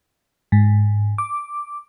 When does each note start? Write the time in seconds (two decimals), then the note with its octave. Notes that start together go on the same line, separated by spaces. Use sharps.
0.52 G#2
1.18 D6